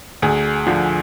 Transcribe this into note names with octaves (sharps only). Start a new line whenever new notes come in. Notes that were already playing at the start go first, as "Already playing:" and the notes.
D2 G#4
D3 F3